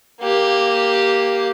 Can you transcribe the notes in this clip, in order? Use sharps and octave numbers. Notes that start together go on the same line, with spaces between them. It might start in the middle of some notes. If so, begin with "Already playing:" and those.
A#3 G4